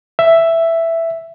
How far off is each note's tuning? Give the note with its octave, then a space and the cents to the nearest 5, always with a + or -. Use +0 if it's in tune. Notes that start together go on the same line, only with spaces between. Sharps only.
E5 +5